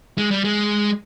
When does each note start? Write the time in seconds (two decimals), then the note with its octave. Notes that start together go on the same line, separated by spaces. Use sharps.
0.18 G#3
0.31 G3
0.44 G#3